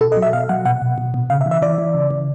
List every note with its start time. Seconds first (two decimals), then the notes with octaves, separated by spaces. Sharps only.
0.01 B2 A4
0.12 D#5
0.17 F#3
0.22 E5
0.33 B2 F5
0.49 F#3 F#5
0.65 B2 F#5
0.82 B2
0.98 B2
1.14 B2
1.30 C#3 F5
1.41 E5
1.46 E3
1.51 E5
1.62 E3 D5
1.78 E3
1.94 C#3
2.11 E3